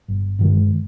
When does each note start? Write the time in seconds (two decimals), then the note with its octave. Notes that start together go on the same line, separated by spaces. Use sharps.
0.08 G1
0.39 G2 D#3 G#3